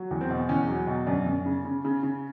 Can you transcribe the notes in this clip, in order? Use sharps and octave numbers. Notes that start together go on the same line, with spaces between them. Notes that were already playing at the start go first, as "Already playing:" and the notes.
Already playing: F#3
E2
C4
B2
E2 C#4
F#3
B2
F#2 D4
F#2
C#3
C#3
C#3
C#3